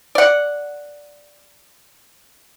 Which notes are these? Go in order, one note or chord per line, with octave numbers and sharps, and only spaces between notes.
D5 F#5